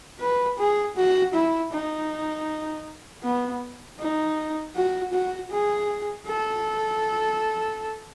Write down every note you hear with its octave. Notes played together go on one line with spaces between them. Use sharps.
B4
G#4
F#4
E4
D#4
B3
D#4
F#4
F#4
G#4
A4